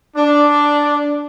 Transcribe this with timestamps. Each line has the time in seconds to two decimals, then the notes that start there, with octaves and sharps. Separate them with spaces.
0.16 D4